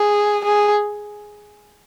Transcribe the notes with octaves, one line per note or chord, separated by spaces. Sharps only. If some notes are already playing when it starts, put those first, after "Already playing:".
Already playing: G#4
G#4